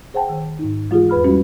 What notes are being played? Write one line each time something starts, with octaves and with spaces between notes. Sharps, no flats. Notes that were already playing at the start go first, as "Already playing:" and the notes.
G#4 C5 F#5 G5 A5
D#3
G#2 D#4
E3 G#3 F4 G4 G#4
E2 B4 B5 F6
G3 G#3 C#4 E4 F#4